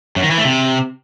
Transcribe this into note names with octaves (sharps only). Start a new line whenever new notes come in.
F#2
D#3
E3
A3
C3